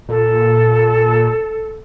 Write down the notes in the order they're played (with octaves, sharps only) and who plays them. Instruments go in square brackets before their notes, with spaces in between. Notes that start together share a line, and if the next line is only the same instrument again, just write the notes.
[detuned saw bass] A#2 [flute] A4